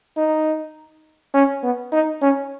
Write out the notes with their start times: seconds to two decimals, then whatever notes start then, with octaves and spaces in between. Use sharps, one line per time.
0.17 D#4
1.34 C#4
1.63 B3
1.92 D#4
2.22 C#4